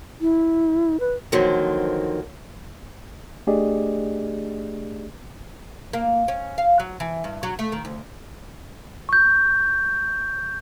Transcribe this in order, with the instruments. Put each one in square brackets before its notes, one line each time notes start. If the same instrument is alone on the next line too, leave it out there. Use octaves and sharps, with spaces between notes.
[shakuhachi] E4
B4
[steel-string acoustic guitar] D3 D#3 F3 F#3 A#3 C4
[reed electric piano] A3 D4 G4 G#4 D5 D#5
[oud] A#3
C#4
F5
F#3
E3
G2
F#3
A3
D#3
D2
[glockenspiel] C#6 G6